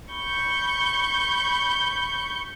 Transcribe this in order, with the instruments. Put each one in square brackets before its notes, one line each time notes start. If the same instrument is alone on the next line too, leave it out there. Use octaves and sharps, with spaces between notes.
[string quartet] B5 C#6 G6